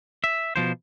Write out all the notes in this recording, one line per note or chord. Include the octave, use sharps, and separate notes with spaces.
E5
B2 F3 C5